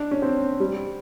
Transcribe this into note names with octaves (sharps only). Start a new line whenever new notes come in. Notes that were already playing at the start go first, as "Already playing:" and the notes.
Already playing: D4
C#4
C4
G3